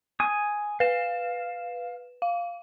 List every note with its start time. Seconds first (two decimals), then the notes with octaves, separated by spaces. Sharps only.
0.20 G#5 D#6
0.80 B4 F5 E7
2.22 F5